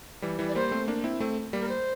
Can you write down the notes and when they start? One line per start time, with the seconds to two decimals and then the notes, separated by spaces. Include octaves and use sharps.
0.22 E3 G3
0.39 E3 G3
0.49 D5
0.55 G3 A#3 C5
0.71 A3 C4
0.88 A#3 D4
1.04 C4 E4
1.20 A3 C4
1.53 G3 A#3
1.60 A#4
1.69 C5